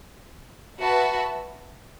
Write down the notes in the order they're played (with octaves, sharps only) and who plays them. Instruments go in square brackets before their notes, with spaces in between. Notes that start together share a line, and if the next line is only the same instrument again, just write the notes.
[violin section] F#4 B4 E5 A5